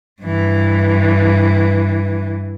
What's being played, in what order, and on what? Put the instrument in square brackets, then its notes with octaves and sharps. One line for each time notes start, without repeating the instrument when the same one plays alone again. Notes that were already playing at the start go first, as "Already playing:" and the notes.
[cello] G2 E3